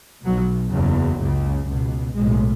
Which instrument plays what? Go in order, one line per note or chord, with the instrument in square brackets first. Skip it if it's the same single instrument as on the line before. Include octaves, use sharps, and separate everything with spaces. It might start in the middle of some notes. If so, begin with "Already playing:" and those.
[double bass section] B1 B2 F#3
F#1 E2 C#3 F#3
C#2 C#3
C#2 B2
B1 A2 G#3